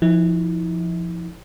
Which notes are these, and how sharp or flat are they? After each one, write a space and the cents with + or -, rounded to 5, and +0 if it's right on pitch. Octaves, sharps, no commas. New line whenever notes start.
F3 -15 E4 -45